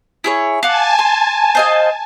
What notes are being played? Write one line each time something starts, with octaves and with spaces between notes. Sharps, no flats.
E4 G#4 C#5
F5 F#5 G#5 A5 D6
C6
C5 D#5 F5